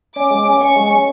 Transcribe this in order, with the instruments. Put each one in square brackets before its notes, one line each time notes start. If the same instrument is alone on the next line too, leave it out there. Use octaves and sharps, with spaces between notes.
[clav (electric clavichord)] C#4 [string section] D6
[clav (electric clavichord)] G#3
C#4
[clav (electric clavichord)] C#4 [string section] C#6
[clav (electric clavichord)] G#3
C#4